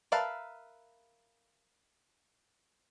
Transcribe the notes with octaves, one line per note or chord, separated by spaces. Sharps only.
A#4 B4 E5 F5 A5